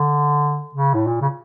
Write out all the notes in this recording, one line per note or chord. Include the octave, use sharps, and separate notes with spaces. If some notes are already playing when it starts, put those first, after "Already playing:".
Already playing: D3
C#3
A2
A#2
C#3